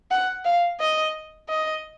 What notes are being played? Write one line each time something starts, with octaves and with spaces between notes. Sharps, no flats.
F#5
F5
D#5
D#5